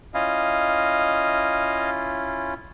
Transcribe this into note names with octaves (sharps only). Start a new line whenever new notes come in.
C#4 E4 F4 D#5 F5